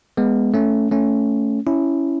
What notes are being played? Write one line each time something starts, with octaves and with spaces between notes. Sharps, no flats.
G#3 B3
A3 C#4
A3 C#4
C#4 E4